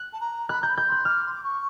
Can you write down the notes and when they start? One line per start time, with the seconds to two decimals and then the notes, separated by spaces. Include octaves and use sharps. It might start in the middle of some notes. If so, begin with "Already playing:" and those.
Already playing: F#6
0.12 A5
0.20 A#5
0.49 B5 F#6
0.61 A#5 G6
0.68 B5
0.77 G6
0.87 C6 F#6
1.05 D6 F6
1.25 C6
1.34 D6
1.43 C#6